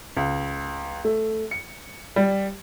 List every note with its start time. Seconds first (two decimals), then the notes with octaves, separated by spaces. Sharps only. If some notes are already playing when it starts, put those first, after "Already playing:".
0.17 C#2
1.05 A3
1.51 C#7
2.16 G3